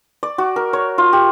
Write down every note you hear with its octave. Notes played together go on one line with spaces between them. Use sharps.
D5
F#4
A#4
C#5
F4
G4